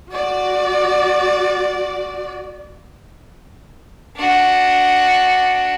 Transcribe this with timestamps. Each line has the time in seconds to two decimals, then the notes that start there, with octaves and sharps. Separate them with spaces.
0.11 F#4 D5
4.17 D4 F#4